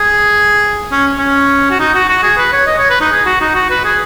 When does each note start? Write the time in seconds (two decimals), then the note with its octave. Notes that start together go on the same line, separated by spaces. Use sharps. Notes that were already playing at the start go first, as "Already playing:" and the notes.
Already playing: G#4
0.92 C#4
1.18 C#4
1.70 F#4
1.80 D#4
1.94 F#4
2.09 F#4
2.23 G#4
2.37 B4
2.53 C#5
2.67 D#5
2.78 C#5
2.90 B4
3.01 D#4
3.12 G#4
3.26 F#4
3.41 D#4
3.55 F#4
3.70 B4
3.85 G#4